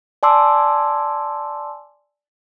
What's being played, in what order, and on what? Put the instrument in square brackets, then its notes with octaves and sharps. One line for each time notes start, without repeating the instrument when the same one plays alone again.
[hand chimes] D5 G#5 A5 C6 D6 E6